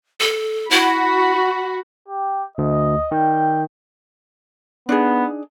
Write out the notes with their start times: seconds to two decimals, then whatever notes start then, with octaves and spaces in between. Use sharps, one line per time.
0.20 A4
0.71 E4 F#4 B5
2.08 G4
2.58 D2 D#5
3.12 D#3 G3 G5
4.89 B3 D4 D#4 G#4